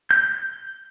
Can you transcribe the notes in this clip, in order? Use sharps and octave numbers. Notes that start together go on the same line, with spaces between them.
G6